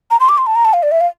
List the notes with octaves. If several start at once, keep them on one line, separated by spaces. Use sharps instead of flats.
A#5
C6
D6
C6
A5
A#5
A5
F5
D5
E5
F5